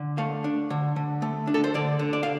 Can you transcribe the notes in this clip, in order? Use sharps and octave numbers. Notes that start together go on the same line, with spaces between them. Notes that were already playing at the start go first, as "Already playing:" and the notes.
Already playing: D3
A3 F5
D4
D3
D3
A3
D4
A4
C5
D3 D5
D3
D5
F5